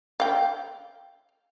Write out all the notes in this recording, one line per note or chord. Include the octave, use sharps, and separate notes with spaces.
F5 G5